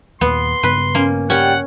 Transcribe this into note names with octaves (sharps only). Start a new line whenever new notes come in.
D#2 A#2 B3 C6
G2 C#3 B3 B4
A#3 C#4
G3 C#4 F#5 G5